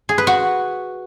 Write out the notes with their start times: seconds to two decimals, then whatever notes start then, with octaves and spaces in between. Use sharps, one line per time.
0.09 G#4
0.18 B4
0.27 F#4